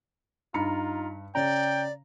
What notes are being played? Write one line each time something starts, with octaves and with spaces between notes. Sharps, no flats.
G2 D#4 F4 A#5 B5 C#7
C#3 C#4 D5 G5 A#5